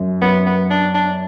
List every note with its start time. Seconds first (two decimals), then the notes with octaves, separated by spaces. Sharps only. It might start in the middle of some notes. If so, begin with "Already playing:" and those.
Already playing: F#2
0.22 F#2 B3
0.46 B3
0.70 D4
0.94 D4